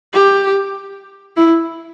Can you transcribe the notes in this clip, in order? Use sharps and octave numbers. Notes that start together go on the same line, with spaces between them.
G4
E4